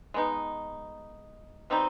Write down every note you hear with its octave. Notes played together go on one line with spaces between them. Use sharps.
G#3 B3 D#4
B2 G3 C4 D#4